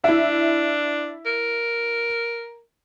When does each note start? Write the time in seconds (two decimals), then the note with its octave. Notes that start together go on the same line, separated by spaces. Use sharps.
0.04 D4 E4 E5
1.25 A#4